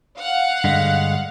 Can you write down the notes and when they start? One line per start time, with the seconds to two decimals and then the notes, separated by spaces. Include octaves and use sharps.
0.19 F5 F#5
0.64 G2 D3 G#3